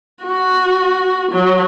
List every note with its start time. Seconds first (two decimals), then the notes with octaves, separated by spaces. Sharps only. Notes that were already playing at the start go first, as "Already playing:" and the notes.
0.23 F#4
1.31 F#3